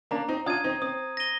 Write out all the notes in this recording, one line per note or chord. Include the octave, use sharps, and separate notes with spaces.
A#3 D4 A#5
C4 D#4
D4 F4 D#6 G#6 D#7
C4 D#4
C4 D#6
A#6 D#7 G7